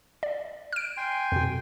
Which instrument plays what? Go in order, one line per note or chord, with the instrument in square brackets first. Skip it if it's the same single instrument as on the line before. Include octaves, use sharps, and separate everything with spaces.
[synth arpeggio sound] D5
F6 D7
[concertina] G5 G#5 C6
[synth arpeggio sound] F2 B2